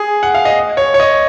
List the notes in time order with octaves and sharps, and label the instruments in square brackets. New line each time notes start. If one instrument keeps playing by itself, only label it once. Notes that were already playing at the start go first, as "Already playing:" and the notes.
Already playing: [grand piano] G#4
F#5
F5
D#5
C#5
C#5
D#5